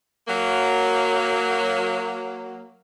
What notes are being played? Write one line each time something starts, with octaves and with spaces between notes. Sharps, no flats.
F#3 A#3